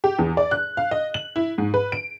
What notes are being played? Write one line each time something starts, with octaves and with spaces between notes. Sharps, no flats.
G4
E2
D5
F#6
F5
D#5
F#7
E4
G#2
B4
D7